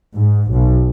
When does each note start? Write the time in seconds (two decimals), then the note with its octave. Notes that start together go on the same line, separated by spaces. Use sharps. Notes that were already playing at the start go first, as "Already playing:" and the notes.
0.16 G#2
0.52 B1